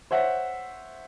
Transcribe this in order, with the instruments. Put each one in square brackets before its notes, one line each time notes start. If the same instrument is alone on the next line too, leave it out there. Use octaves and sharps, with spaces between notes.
[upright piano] C5 C#5 E5 F#5